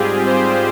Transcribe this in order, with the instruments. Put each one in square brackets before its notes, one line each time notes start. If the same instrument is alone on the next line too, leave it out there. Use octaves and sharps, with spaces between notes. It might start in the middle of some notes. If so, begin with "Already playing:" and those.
Already playing: [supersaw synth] G#2 G3 C4 F4 G4 G#4
C5